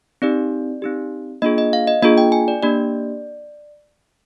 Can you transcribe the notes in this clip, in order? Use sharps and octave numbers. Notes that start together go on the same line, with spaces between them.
C4 D#4 G4 D5
C4 D#4 G4
A#3 D4 F4 G#4 D#5
D#5
F5
D#5
A#3 D4 F4 G#4 D#5
G5
G#5
D5
A#3 D4 G4 D5